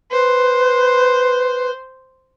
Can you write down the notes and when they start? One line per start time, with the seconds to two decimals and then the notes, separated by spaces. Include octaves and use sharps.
0.11 B4 C5